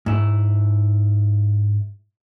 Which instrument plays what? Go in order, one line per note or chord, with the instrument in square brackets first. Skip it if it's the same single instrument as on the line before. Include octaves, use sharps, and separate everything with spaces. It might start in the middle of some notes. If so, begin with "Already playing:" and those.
[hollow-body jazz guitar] G#2 E4